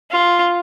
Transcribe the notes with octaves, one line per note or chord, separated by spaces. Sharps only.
F4